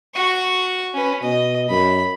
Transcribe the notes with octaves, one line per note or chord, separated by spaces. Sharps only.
F#4 C#6
C#4 B4
B2 D#5
F#2 B5